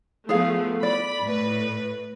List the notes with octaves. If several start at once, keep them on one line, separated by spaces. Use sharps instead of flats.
F3 A3 B3 G#4 F5
D5 B5
A2 B4